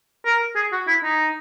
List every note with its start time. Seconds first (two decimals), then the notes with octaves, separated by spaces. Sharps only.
0.25 A#4
0.55 G#4
0.72 F#4
0.87 E4
1.03 D#4